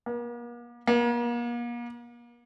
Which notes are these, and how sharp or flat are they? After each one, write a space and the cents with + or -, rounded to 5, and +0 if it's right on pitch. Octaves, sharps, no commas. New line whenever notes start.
A#3 +45
A#3 +40